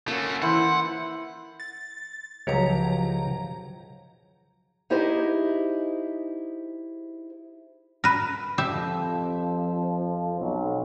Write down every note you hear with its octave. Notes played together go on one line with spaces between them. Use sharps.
A3 A#3 C#4 F#4 A#4
E3 E4 C5 E5 F#5
A6
C#2 F3 F#3 G4 C#5 A#5
D#4 E4 G4 G#4 C5 D#5
A#4 B4
F2 F3 G4 E5
B1